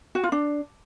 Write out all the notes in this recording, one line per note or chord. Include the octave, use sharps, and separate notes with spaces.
F#4
F4
D4